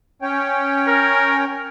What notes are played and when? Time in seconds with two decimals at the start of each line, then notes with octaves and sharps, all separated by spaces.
0.22 C#4 C#5 G5
0.88 A#4